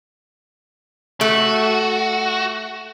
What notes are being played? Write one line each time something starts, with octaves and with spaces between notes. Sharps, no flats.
A3 F#4